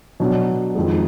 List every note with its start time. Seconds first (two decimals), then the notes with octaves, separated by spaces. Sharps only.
0.20 B2 F#3 D4
0.75 F2 D#3 G#3